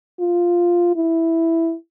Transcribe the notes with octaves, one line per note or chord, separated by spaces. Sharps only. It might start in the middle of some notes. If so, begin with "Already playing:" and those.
F4
E4